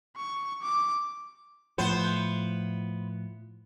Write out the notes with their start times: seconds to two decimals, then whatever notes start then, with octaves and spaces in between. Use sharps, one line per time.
0.17 C#6
0.63 D6
1.78 A2 F3 B3 C5